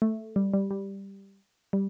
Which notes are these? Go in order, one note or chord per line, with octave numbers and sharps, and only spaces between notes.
A3
G3
G3
G3
G3